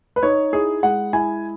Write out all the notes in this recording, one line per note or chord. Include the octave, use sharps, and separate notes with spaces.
B4
D#4 C#5
E4 G#4
G#3 F#5
E4 G#5